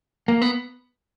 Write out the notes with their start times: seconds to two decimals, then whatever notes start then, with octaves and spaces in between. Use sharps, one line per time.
0.28 A#3
0.42 B3